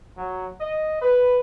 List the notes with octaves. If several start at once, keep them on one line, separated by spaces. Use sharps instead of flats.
F#3
D#5
B4